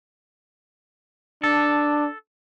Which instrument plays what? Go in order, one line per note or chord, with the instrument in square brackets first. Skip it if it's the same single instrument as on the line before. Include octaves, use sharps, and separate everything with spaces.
[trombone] D4 [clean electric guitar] A4